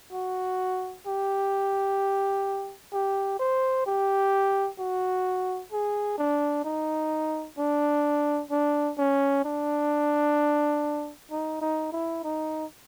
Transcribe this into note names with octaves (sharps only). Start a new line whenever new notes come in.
F#4
G4
G4
C5
G4
F#4
G#4
D4
D#4
D4
D4
C#4
D4
D#4
D#4
E4
D#4